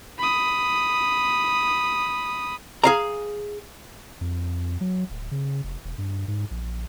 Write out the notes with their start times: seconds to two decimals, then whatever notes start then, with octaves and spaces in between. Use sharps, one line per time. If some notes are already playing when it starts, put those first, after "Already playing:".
0.18 B5 D#6
2.84 G#4 F5 A#5
4.21 F2
4.81 F#3
5.10 D1
5.31 C#3
5.64 F1
5.84 E1
5.98 G2
6.28 G#2
6.51 A#1